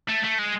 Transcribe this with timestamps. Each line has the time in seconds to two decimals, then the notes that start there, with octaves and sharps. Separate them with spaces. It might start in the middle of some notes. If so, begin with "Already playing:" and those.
0.08 A3
0.24 A3
0.39 G#3